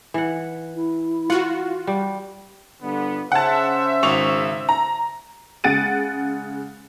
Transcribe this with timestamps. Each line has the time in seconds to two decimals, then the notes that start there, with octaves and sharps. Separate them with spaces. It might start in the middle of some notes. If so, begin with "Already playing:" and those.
0.14 E3 F#5
0.75 E4
1.30 F4 F#4 F#5
1.87 G3
2.83 G1 D3 B3
3.32 C#3 C5 E5 F#5 A5
4.03 G#1 C#6 F7
4.69 A#5
5.64 C#3 G#3 F#5 A6 D7 D#7